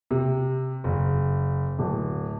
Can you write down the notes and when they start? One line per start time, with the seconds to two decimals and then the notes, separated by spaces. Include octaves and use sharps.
0.11 C3
0.84 F#1
1.79 D1